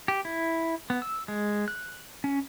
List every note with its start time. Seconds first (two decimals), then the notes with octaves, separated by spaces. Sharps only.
0.08 G4
0.25 E4
0.90 B3
1.02 E6
1.28 G#3
1.68 F#6
2.24 C#4